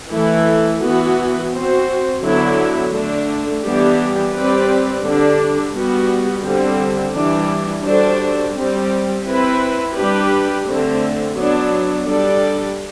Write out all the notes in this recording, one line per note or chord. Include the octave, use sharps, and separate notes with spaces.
E3 A3 E4 A4
E3 B3 F#4 B4
C4 F#4 C5
D3 F#3 B3 E4
D3 A3 D4
E3 G3 B3 D4 G4
G3 C4 G4 B4 D5
D3 G3 D4
G3 B3 F#4
D3 G3 C4
E3 G3 D4
G3 D4 F#4 A4 C5
G3 C4 G4
C4 E4 B4
G3 D4 G4 B4
D3 A3 C4
F#3 B3 D4
G3 D4 A4 D5